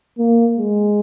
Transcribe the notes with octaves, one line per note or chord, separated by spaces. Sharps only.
A#3
G#3